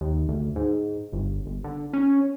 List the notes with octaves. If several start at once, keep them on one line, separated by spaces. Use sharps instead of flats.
D#2
D2
G#2
G1
G1
D3
C#4